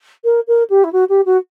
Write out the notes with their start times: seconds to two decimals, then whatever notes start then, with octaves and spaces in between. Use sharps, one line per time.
0.24 A#4
0.47 A#4
0.70 G4
0.84 E4
0.92 F#4
1.09 G4
1.25 F#4